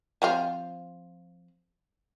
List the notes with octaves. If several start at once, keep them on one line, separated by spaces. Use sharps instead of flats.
F3 C4 F4